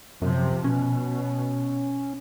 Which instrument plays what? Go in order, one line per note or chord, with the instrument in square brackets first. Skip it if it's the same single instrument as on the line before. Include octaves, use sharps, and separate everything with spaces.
[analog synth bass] F#2 [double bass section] C3 F3
[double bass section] B2 [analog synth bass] C#4